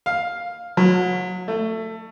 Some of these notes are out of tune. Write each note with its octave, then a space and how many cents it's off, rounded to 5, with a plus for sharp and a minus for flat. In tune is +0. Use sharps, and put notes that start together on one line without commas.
F5 +5
F#3 -30
A3 +20